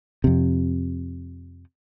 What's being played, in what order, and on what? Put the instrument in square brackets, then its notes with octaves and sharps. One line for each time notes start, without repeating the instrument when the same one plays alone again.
[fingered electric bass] F2 C3